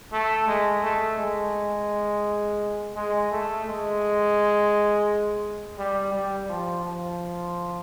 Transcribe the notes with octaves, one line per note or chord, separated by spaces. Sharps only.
A3
G#3
A3
G#3
G#3
A3
G#3
G3
G3
F3
F3